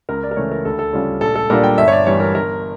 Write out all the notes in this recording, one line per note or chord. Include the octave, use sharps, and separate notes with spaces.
C#2 A#4
D5
A#4
C#3 E3 A3 C#5
A#4
D2 A4
A4
C#3 G3 C#4 F4
A#1 A4
A4
A#2 G3 D4 F4 A#4
G5
G1 E5
C#5
D5
G2 E3 G3 C#5
A#4
G1 A#4